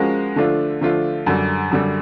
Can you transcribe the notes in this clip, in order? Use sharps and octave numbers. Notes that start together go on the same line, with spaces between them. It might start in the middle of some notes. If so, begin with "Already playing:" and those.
Already playing: F3 G#3 C#4 F#4 A#4
D3 F3 A3 D4 F4
D3 F3 A3 D4 F4
F#2 D3 G3
F#2 D3 G3